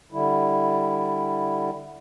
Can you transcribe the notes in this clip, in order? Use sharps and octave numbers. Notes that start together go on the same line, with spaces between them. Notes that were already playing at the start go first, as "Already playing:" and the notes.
D3 G3 E4